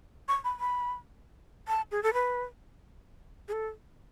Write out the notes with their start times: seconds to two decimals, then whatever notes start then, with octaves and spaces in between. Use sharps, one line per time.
0.28 C#6
0.44 B5
0.60 B5
1.68 A5
1.91 G#4
2.03 A4
2.14 B4
3.48 G#4
3.53 A4